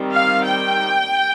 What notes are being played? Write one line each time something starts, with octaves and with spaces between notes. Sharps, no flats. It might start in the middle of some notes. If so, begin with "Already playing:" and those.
Already playing: D#3 G3 C4
F5
G5